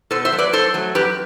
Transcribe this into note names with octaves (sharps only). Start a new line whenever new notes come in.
B2 A4 C5
C5 E5
F#3 A3
B4 D5
F#2 A4 C5
F#3 A3
F#2 G4 B4